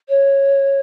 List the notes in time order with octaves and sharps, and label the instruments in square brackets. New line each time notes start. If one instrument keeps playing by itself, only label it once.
[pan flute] C#5